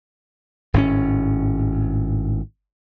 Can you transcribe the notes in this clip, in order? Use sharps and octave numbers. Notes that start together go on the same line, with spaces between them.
G#1 A2 C4 C#4